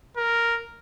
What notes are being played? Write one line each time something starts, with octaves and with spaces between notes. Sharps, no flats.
A#4